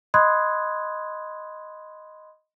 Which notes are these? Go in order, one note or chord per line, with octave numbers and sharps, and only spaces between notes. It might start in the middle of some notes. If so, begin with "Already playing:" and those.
D#5 B5 C6 D#6 F#6 G#6